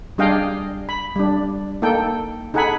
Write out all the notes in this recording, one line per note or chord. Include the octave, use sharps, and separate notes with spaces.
G3 D4 G#4 D#5 F5 G5
B5
G3 D4
A#3 D#4 A4 G5
D#4 G#4 A4 F#5 G#5 B5